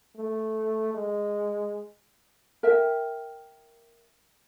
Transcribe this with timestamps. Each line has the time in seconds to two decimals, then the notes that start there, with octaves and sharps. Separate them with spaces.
0.16 A3
0.94 G#3
2.63 A#4 E5 G5